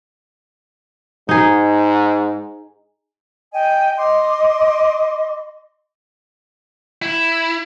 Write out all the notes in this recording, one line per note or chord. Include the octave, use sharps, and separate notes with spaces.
G#2 D#4 G#4
D#5 G5 G#5
D#5 C6 D6
E4